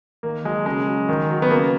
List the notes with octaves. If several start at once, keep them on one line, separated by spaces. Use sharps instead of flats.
D#3 A#3
F#3 G#3
C#3 G#3
F#3
D#3
F#3
B3
C#3 A#3